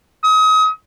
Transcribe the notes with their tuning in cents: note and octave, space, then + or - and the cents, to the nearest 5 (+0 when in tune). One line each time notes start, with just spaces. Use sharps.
D#6 +35